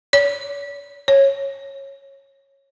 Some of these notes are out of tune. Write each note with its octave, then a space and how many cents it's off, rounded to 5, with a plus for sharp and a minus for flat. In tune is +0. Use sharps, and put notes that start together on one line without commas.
C#5 +45
C#5 -20